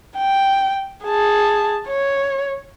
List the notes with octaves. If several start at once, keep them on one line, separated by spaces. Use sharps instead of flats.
G5
G#4 A5
C#5